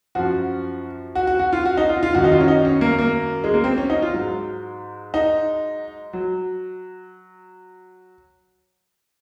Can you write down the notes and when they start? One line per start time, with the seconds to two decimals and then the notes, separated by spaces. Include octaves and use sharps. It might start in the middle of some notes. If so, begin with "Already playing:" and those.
0.15 F#2 F3 F#4
1.15 F#4
1.27 F#4
1.39 F#4
1.53 F4
1.66 F#4
1.77 D#4
1.89 F4
2.03 F4
2.15 F#2 D#3 F#3 F#4
2.24 D#4
2.32 F4
2.40 C#4
2.48 D#4
2.65 C#4
2.81 A#3
2.99 A#3
3.44 G#3
3.54 A#3
3.64 C4
3.78 C#4
3.90 D#4
4.02 F4
4.14 G#2 F#3
5.14 D#4
6.13 F#3